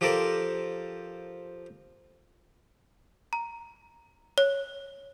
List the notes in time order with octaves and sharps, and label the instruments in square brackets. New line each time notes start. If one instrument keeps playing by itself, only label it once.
[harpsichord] F3 G4 A4 A#4 C5 D5
[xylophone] A#5
C#5